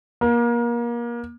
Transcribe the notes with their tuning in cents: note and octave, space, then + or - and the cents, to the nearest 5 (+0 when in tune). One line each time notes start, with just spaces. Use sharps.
A#3 +30